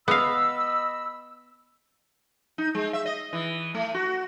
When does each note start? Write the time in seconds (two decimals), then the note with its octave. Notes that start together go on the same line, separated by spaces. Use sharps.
0.08 B3 D#5 F5 B5 E6
2.58 D#4
2.75 G#3
2.93 E5
3.06 D#5
3.33 E3
3.74 A3
3.94 F#4